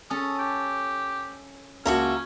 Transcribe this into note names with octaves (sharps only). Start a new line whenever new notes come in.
C#4 A4 D#6
G4
C#2 A#3 C#4 F#4 E5 A5 A#5